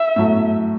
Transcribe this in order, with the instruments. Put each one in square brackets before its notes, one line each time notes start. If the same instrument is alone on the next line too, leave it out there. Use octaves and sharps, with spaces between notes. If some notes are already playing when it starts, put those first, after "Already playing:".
Already playing: [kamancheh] E5
[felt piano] A2 F#3 A3